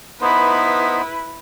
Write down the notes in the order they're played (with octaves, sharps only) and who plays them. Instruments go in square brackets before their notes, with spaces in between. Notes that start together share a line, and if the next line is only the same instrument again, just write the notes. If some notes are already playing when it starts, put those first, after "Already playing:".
[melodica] B3 D#4 C5 [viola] E4 B4